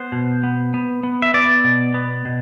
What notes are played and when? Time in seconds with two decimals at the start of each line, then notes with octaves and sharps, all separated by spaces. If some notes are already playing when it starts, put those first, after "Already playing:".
Already playing: B3 C5
0.12 B2
0.43 B3
0.74 B3
1.03 B3
1.22 E5
1.34 B3 D5
1.64 B2
1.94 B3
2.25 B2